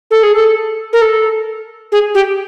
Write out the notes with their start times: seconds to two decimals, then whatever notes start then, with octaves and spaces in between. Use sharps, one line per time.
0.11 A4
0.23 G#4
0.35 A4
0.93 A#4
1.02 A4
1.92 G#4
2.15 G4